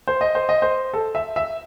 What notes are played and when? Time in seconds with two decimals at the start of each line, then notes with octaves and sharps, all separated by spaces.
0.07 C5
0.21 D#5
0.35 C5
0.49 D#5
0.62 C5
0.94 A4
1.15 E5
1.36 E5